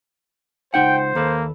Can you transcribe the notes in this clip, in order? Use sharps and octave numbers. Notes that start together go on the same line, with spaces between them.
C#2 D#4 C5 F#5 G5
D#2 A#3 A4 B4